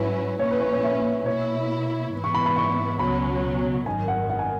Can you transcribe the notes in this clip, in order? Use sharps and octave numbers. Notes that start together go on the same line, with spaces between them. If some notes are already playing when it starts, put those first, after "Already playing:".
Already playing: G#2 F#3 C#4 E4 B4
A#1 A#2 A#3 C#4 E4 C#5
B4
C#5
C#5
E5
B2 A#3 E4 C#5
G#2 E3 B3 E4
C#6
B5
B5
C#6
C#2 B2 F#3 C#4 B5
G#1 F#2 D#3 G#5
F#5
F#5
G#5